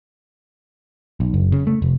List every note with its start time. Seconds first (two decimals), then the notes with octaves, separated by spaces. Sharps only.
1.20 B1
1.34 F#1
1.52 C#3
1.67 A3
1.82 F1